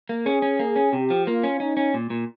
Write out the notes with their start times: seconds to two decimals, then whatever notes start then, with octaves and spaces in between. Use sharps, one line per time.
0.09 A#3
0.26 C#4 G#4
0.42 C#4
0.59 A#3 G#4
0.76 C#4
0.93 C3 G4
1.10 F3
1.27 A#3 F4
1.43 C#4
1.60 C#4 D#4
1.77 C#4
1.94 A#2
2.10 A#2